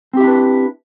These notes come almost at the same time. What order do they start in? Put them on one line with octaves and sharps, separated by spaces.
C4 G4 E4 D4 B4